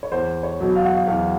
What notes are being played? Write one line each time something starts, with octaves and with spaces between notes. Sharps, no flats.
C#5
E2 C5
C#5
B2 F#3
F5
F#5
F5
E2 F5